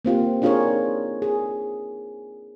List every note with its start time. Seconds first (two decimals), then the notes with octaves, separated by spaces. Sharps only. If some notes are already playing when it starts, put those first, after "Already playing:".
0.05 A#3 C4 F4 G4
0.42 D4 D#4 F4 G#4 A#4 C#5
1.22 G#4